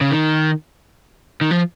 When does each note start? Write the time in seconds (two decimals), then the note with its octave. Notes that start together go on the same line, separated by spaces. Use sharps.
0.01 C#3
0.11 D#3
1.41 D#3
1.51 F3